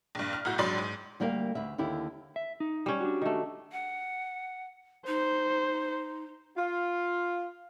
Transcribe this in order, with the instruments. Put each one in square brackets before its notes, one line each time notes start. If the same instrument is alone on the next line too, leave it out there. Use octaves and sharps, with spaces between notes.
[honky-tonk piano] A#1 G2
F6
B1 A2 F#4 F6 G6
A#1 G#2 F#3 D5 B5 C6
G#2
[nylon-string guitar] D2 G3 A#3 A#4 C5 F5
D2 B4 E5
D#2 D3 E4 G4
[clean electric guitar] E5
D#4
[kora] G3 C#4
[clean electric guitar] D4 F#4
[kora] D#3 A3
[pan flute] F#5
[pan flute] D#4 [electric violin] C5
[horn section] F4